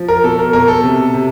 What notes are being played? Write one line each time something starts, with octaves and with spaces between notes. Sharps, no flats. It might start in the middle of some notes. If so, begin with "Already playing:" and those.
Already playing: F3
A#4
B2 A4
A#4
B2 A#4
A4
C3
C3